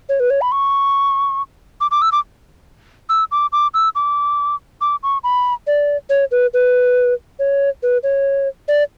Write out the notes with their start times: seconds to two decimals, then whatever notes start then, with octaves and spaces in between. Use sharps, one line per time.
0.09 C#5
0.20 B4
0.30 C#5
0.41 B5
0.52 C#6
1.81 D6
1.91 D6
2.02 E6
2.12 D6
3.09 E6
3.31 D6
3.52 D6
3.74 E6
3.95 D6
4.81 D6
5.03 C#6
5.24 B5
5.67 D5
6.10 C#5
6.31 B4
6.54 B4
7.39 C#5
7.83 B4
8.03 C#5
8.68 D5